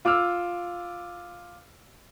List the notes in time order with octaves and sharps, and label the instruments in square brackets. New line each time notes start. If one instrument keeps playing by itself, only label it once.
[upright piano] F4 D6 E6 F6